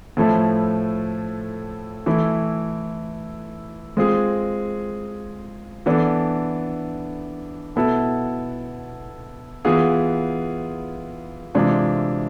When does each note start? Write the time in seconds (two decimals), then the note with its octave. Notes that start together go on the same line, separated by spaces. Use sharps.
0.17 A2 F3 A3 E4 A4
2.06 E3 A3 E4
3.97 G#3 C4 F4 G#4
5.86 E3 B3 D4 A4
7.76 B2 B3 E4 A4
9.65 E3 B3 F4 G#4
11.55 C3 E3 G#3 D4 F4